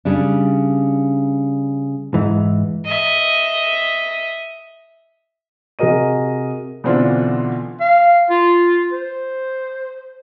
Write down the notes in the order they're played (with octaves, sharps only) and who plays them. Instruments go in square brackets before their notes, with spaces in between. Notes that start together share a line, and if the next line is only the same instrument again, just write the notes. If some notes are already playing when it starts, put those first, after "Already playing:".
[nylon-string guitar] C#3 G3 D4
[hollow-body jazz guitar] G#2 E3
[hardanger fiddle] D#5 E5
[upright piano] C3 F#4 G#4 A#4 D#5 D#7
[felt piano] B2 D3 E3 C4 D4 F4
[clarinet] F5
F4
C5